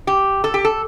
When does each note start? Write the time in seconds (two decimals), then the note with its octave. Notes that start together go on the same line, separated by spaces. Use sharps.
0.07 G4
0.44 A4
0.54 G4
0.65 A4